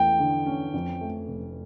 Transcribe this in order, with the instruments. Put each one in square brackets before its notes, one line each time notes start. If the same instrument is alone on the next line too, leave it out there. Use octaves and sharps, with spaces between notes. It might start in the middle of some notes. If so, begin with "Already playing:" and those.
Already playing: [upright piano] E2 A3 [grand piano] G5
[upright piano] D3
C#4
F2
A3
F1